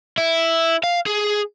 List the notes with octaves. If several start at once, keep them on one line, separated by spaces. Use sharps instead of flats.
E4
F5
G#4